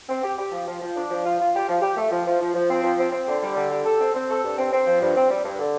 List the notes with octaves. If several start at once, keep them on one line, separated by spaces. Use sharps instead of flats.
C4
G4
G4
F3
F3
F3
D4
F3
F4
F4
G4
F3
G4
A3
F3
F3
F3
F3
C4
F3
C4
C4
D3
G3
D3
G4
A4
C4
C4
A4
G2
C4
C4
F3
G2
C4
G3
G2
D3